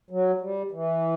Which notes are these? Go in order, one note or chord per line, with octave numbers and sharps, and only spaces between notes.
F#3
G3
E3